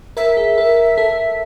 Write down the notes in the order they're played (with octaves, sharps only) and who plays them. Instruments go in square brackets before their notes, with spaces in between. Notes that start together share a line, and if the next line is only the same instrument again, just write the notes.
[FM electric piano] A#4 [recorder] E5
[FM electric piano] G#4
A#4
A4